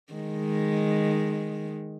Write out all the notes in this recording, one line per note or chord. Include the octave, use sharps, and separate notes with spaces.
D#3 G#3